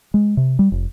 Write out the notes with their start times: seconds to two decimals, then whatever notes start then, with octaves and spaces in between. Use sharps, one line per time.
0.14 G#3
0.37 C3
0.59 G3
0.72 F1